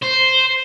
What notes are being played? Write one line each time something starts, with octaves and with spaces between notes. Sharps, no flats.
C5